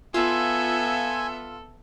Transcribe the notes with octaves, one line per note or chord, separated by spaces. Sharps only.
B3 F4 A4 E5 G#5